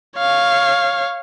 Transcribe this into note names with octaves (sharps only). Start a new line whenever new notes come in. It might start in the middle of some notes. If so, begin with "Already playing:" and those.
C#5 F5